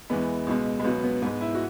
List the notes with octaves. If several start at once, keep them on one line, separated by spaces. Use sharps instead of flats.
E2 E3 G#3 B3
C#2 B2 G#3
G#3
C#2 B2 F#3 B3
B3
G#2 G#3 B3
E4
F#4